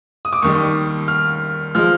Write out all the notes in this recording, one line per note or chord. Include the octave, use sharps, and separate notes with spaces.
D#6
D6
D#2 D#3 G3 C#6
F6
F3 G#3 F6